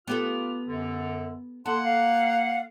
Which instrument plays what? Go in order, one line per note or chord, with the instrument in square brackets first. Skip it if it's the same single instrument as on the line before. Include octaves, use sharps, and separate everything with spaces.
[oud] B3 G4 A4 [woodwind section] F4 D6 F6
[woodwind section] F#2 D3
[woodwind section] A#3 [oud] A4 [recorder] F#5 [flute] C6
[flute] F5